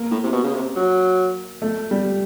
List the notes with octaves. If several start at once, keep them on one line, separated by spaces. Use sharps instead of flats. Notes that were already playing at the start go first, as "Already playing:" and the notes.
Already playing: A#3
A2
C3
B2
C#3
C3
F#3
A3
G3